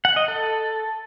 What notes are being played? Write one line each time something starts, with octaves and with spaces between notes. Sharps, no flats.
F#5
D#5
A4